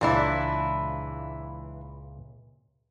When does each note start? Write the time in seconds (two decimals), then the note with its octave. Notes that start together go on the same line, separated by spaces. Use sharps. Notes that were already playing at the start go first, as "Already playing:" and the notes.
0.01 C#2 A#2 E3 D4 E4